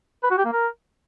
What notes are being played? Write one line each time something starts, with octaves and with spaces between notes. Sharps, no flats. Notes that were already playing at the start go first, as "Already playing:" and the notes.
B4
F#4
G4
A#3
A#4